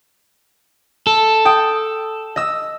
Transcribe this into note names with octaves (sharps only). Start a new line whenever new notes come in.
A4
G5 D#6
D#5 E6